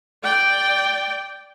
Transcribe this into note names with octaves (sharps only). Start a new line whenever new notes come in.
D5 G5